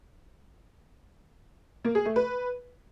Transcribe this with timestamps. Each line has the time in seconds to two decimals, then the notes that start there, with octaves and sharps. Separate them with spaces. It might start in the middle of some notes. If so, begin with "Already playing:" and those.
1.85 A#3
1.95 G#4
2.05 A3
2.16 B4